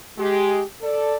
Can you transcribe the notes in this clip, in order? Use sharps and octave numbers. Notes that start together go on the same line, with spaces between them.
G#3 G4
A4 D5